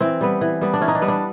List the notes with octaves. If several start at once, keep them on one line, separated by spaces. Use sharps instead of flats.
E3 C4
G3 B3
E3
G3 B3
D4
E3 C#4
D#4
D4
G3 B3
D4